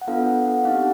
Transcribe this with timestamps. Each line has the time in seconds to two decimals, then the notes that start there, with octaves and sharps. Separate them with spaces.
0.01 F#5
0.07 B3 D4 F4 A4 F5
0.26 F#5
0.45 F#5
0.64 C4 D#4 G4 F5